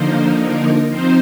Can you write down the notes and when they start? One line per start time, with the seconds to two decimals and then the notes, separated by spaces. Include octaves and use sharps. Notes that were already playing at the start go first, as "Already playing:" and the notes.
Already playing: D3 F3 A#3 D#4 C5
0.40 A#4
0.89 F3 C4 D#4 C5